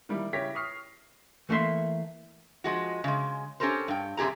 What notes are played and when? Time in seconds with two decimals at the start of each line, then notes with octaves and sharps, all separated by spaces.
0.09 D#3 E3 G3 A#3 E4 A#4
0.33 C#3 E4 G4 C#5 A#6 B6
0.55 C#6 D#6 F6 C7
1.49 E3 A3 A#3 E5 C6
2.64 F3 G#3 F#4
3.04 C#3 G#3
3.60 C#4 G4 A4 A#4 C5
3.88 G2 G5
4.17 F#2 C3 G4 G#4 A#5